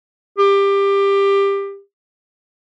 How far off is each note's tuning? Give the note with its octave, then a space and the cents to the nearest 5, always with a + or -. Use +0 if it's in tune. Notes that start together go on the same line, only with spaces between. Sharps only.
G4 +20